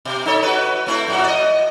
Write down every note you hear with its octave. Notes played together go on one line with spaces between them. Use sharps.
B2
D#4 A4 C#5
F#4 B4
A3 C4 E4
F#2 A2 F#4
D5 D#5